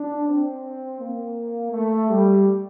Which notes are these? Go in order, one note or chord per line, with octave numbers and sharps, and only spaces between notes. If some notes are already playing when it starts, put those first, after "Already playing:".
Already playing: D4
C4
A#3
A3
G3